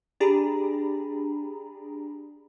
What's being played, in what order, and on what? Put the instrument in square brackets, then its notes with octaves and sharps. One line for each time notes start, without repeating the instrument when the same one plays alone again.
[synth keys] D4 G4 G#4 A#5 B5